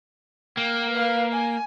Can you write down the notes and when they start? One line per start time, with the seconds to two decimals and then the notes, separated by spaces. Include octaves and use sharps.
0.57 A#3 G5
0.90 B4 F5
1.32 G#5